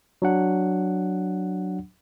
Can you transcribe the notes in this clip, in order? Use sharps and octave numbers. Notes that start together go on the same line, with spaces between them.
F#3 D4 F#5